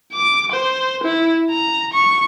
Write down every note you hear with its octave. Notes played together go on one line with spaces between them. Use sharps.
D6
C5
E4
A#5
C#6